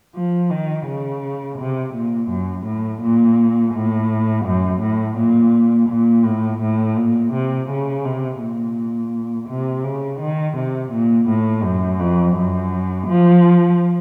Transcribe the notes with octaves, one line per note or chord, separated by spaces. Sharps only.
F3
D#3
C#3
C3
A#2
F#2
A2
A#2
A2
F#2
A2
A#2
A#2
A2
A2
A#2
C3
C#3
C3
A#2
C3
C#3
D#3
C3
A#2
A2
F#2
F2
F#2
F3